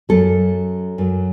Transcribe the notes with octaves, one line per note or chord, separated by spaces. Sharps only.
F#2 F#3 A4
F#2 F#3